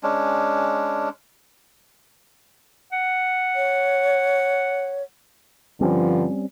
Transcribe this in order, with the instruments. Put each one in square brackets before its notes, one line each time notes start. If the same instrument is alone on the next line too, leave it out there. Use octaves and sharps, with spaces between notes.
[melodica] G#3 C#4 D4
[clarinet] F#5
[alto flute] C#5
[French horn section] G2 D3 F3 [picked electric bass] G3 C4 C#4